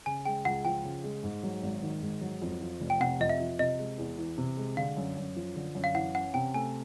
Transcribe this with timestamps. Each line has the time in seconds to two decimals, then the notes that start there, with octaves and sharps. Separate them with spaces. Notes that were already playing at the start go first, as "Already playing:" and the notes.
0.06 C#3 G#5
0.26 G#3 G5
0.45 C#2 F#5
0.65 F3 G5
0.84 C#3
1.04 G#3
1.23 G#2
1.43 F#3
1.62 G#1
1.82 D#3
2.02 G#2
2.21 F#3
2.42 F2
2.61 F3
2.80 F1
2.90 G5
3.00 C3 F#5
3.20 F2 D#5
3.30 E5
3.40 F3
3.59 C3 D#5
3.79 G#3
3.98 E2
4.18 E3
4.38 C3
4.57 G#3
4.77 D3 F5
4.97 F#2
5.17 F#2
5.36 F3
5.56 D3
5.75 F#2
5.84 F5
5.94 E3 F#5
6.14 C#4 F#5
6.34 C3 G5
6.54 A3 G#5